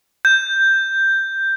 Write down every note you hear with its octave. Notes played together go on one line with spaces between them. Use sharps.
G6